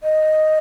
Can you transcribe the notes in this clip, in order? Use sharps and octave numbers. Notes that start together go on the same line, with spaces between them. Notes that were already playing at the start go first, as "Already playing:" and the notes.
D#5